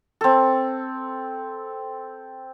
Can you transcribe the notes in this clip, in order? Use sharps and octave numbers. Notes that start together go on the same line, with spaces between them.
C4 A4